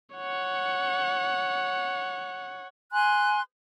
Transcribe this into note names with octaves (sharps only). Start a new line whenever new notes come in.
C#5 F#5
G#5 C6 F#6